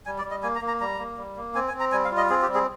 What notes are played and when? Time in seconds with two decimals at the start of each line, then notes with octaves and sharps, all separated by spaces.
0.06 G3 G#5
0.18 D5
0.25 G3
0.31 D#5
0.43 A#3 G#5
0.55 A#5
0.61 A#3
0.68 A#5
0.81 G3 A#5
0.99 A#3
1.17 G3
1.36 A#3
1.55 C4 G#5
1.68 G#5
1.74 C4
1.80 A#5
1.92 G3 G#5
2.05 F5
2.11 F4
2.17 D#5
2.30 C4 G#4
2.42 G4
2.48 G3
2.54 G#4